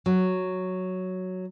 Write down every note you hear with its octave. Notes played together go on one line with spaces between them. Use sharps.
F#3